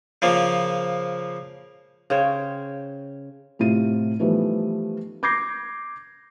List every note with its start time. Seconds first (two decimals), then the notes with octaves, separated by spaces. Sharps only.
0.22 C#3 F3 A#3
2.10 C#3 C5 C#5 G5
3.59 A2 C3 F4 D#7
4.19 E3 F3 G3 A3 B3 D#4
5.23 D6 G6 G#6 A#6 C7